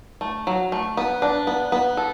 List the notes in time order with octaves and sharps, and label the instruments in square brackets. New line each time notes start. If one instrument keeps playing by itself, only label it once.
[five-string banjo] A3
F#3
A3
B3
D4
B3
B3
A4